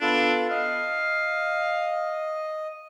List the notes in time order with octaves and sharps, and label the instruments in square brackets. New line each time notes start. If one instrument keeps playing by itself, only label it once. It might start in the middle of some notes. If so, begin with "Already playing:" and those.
[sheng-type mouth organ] B3 F4 A4 [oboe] D4
[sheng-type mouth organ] D#5 [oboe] F5